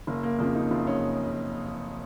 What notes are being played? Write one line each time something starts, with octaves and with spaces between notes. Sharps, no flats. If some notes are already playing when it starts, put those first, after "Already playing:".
F#1 A#3
A#3
F2 C#3 F3 A#3
D#4
F#1 F4
C#4